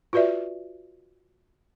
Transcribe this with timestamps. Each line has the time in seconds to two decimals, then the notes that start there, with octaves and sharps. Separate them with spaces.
0.13 F4 F#4 B4 D5 E5